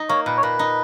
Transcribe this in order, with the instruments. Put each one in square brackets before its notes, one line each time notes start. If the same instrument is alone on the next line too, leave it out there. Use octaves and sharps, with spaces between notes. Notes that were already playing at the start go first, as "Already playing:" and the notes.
Already playing: [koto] D#4
[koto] A#3 [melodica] C#5
[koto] A#2 [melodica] B4
[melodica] C#5
[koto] A#2 [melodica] B4
[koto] D#4